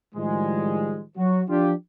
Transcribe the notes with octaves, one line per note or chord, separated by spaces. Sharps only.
A2 D#3 F3 G3 G#3
F#3 F#4
F3 D4 F4 G4